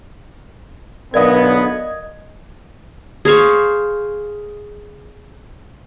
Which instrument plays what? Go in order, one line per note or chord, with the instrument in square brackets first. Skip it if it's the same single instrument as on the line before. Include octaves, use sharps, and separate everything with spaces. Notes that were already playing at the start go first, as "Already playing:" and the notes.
[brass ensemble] B1 D3 B3 [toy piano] A#4 D5 F5 [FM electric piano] D#5 G#6
[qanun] G#4 C5 F5 C#6